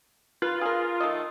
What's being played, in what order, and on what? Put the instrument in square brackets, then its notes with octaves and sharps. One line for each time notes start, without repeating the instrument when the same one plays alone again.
[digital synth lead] F4 [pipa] B4
[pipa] G#4 A#4
D#3 A3 D#5